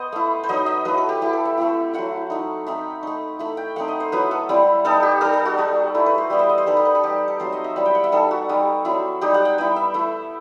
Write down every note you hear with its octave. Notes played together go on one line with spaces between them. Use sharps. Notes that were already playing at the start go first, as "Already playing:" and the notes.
Already playing: B3 C5 D#5
A3 E4
C5
F#3 B3 D#4 D#5
D#5
F#3 A3 E4 B4
A4
G4
A3 E4 G4
A4
E5
A3 C4 E4
F#3 C4 E4 F#5
A3 D#4
A3 C4 D#4 B5
A3 D#4
A3 E4 B5
G5
A3 C4 D#4 F#5
D#5
C5
F#3 B3 E4 B4
A4
G3 C4 E4
G3 B3 D#4 A4
G4
G3 D#4 A4
A4
F#4
G3 D#4
A3 E4
B4
C5
G3 B3 E4 G5
E5
D#5
C5
G3 B3 D#4 A4
G4
B4
A4
G3 D#4 G4
A4
F#3 A3 C4 C5
D#5
E5
G3 B3 E4 B5
G5
F#5
E5
G3 D#4 A4
F#4
G3 D#4
F#3 C4 E4
G3 D#4 G4
F#5
G5
G3 B3 E4
E5
A3 E4